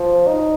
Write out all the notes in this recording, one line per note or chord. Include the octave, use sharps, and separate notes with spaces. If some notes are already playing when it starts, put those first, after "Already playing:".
Already playing: F3
D#4